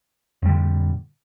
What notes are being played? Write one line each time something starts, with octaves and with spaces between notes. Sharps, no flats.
F2 A#2 D3 G3